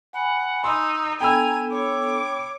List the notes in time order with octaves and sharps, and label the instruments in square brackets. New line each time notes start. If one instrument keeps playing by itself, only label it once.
[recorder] F#5 [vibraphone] G#5 B5
[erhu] D#4 [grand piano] C6 [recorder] E6
[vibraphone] B3 D4 A4 [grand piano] G5 B5 E6 [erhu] G#5 [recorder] A#5
[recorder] C#5 [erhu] D6